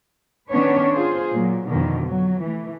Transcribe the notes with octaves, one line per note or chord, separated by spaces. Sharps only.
D#3 B3 C#4 D4 B4 C#5
F4 G#4 C5
A#2 F#3
F2 B2 D3 D#3
F#3
E3 A3